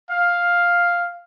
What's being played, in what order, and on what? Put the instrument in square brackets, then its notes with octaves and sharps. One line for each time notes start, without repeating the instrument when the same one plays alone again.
[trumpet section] F5